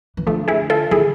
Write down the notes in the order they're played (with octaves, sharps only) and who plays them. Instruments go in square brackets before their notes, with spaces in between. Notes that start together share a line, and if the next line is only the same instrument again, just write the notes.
[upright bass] E3
[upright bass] D3 [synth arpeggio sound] F3 A3
[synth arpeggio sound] E4 G#4
F4 A4
[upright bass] E3 [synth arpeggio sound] E4 G#4